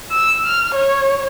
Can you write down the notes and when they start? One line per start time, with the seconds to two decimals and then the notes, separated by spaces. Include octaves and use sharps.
0.11 E6
0.46 F6
0.75 C#5